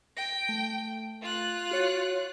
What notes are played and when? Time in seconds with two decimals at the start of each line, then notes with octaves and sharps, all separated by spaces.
0.17 G5 A#6
0.49 A3
1.22 F4 F#6
1.71 F#4 C#5